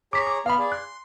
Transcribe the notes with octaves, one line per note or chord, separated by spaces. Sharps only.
G#4 C#5 A#5 D6 B6
D6
B3 F5 B5 F6
G#4 D5
C6 F#6